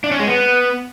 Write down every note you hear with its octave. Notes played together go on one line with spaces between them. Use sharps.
D4
C#4
G#3
B3